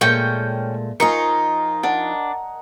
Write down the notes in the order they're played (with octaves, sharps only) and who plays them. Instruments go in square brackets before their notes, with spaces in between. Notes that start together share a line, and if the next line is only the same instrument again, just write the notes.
[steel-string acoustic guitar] A#2 G#3 A3 [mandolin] C#4 G5 C#6
[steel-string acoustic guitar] F3 D#4 F4 [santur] A#4 D#5 G#5 [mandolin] C#6
[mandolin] D4 [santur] F#5